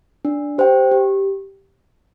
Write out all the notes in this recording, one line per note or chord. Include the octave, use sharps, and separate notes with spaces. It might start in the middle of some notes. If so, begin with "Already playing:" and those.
D4
G4 C5 G5
G4